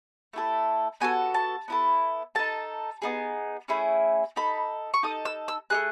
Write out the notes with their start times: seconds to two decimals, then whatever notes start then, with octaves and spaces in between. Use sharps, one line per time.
0.33 A3 E4 A4
1.00 B3 F#4 A4 G#5
1.34 A5
1.68 B3 E4 A4
2.35 D#4 A4 A5
3.02 B3 D#4 G#4
3.68 A3 C#4 E4 G#4
4.36 D#4 A4 B5
4.94 C#6
5.03 D#4 A4 D#6
5.25 E6
5.48 E6
5.70 A3 D#4 G#4 F#6